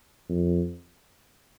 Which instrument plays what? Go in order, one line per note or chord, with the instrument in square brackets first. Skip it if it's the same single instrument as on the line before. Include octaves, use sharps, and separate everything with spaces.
[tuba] F2